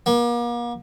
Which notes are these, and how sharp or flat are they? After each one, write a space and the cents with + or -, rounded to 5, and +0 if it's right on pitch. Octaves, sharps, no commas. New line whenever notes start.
A#3 +40